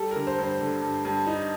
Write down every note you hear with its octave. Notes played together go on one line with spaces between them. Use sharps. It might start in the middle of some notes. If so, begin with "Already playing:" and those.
Already playing: G3 A4
D3 A#4
C5
G2
C5
D3
G2
G2
D#4